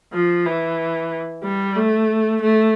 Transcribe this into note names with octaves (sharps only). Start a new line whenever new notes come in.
F3
E3
G3
A3
A3